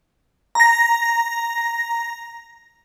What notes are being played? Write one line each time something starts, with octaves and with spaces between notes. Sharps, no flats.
A#5 A#6